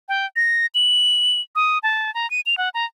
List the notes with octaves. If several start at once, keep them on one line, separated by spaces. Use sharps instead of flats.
G5
A#6
F#7
D#6
A5
A#5
D#7
F7
F#5
A#5